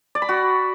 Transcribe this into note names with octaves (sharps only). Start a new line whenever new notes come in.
D5
B5
F#4